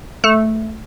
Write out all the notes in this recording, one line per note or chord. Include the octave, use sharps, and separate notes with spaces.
A3